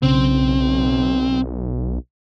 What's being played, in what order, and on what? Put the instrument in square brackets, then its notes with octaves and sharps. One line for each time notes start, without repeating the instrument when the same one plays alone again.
[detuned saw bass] B1 [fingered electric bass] C#3 [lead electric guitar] C4